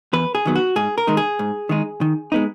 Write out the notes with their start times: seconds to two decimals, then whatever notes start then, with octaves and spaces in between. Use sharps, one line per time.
0.13 E2 B4
0.35 G#4
0.45 D#3 F#3 B3
0.56 F#4
0.76 G#2 G#4
0.98 A#4
1.07 D#3 G#3 D#4
1.17 G#4
1.39 G#2
1.69 D#3 G#3 D#4
2.01 D#3
2.32 G#3 B3 D#4